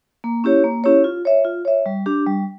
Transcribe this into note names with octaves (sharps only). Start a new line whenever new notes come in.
A#3
C#4 E4 G4 C#5
A#3
C#4 E4 G4 C#5
F4
C#5 E5
F4
C#5 E5
G3
D4 G4
G3